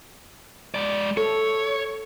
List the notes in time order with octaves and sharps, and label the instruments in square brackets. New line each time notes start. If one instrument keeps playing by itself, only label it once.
[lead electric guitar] G#3 D5
[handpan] A4 [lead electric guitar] C#5